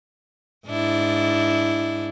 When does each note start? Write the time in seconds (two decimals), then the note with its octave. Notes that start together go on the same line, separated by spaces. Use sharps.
0.68 G#2 D4 E4